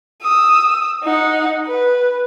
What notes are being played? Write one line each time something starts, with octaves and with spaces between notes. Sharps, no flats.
D#6 E6
D#4 F#5
B4